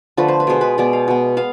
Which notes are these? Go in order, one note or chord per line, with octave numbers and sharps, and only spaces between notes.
D3 F3 A3 B4
C5
B4
B2 G#3 B3 C5
B4
B2 G#3 B3 D5
F5
B2 B3
B3 F5